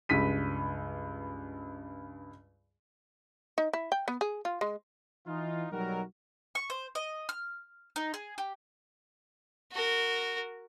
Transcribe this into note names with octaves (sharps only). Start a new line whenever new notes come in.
C#2 G2 B6 D#7
D#4
E4
G5
B3
G#4
F4
G#3
E3 D#4 F4
B1 F#3 G3 D#4 F#4 A#4
C#6
C5
D#5
F6
D#4
G#4
G4
F#4 A#4